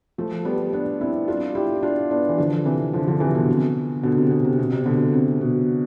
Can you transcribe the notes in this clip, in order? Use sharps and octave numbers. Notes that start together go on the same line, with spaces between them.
F3 A3
G3 B3
B3 D4
C4 E4
D4 F4
E4 G4
E4
D4 F4
B3 D4
E3
D3 F3
C3 E3
D3 F3
D3 F3
C3 E3
B2 D3
B2 D3
C3
B2
C3
B2
C3
B2 D3
C3
B2